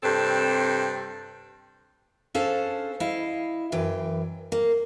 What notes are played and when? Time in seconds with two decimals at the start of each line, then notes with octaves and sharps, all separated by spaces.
0.03 G2 C3 C4 A4
2.35 C#4 D4 A4 C5 F5
3.00 E4 D#5 F5
3.72 F#2 E3 G5
4.52 A#3